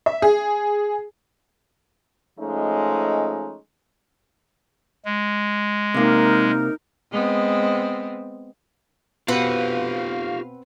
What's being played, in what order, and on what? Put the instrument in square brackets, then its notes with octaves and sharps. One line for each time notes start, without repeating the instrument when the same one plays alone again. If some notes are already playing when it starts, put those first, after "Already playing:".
[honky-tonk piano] E5
G#4
[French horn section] F3 G#3 A3 C#4 D#4
[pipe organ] G#3
[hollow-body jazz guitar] C3 A#3 [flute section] D#4 A#4
[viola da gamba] G#3 B3 C4
[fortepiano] B2 [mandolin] C4 B4 F#5 [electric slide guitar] F4 G4 [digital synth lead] F5